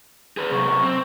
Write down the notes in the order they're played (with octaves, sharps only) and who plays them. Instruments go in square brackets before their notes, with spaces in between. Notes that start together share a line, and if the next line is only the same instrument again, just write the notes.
[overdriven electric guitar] G#4 B4
[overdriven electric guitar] C3 F#3 [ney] C#6
[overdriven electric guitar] C4